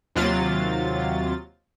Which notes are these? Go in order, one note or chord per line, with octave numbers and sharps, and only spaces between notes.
D#2 C3 F#3 F4 A6